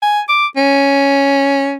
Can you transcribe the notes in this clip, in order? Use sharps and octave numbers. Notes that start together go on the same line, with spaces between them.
G#5
D6
C#4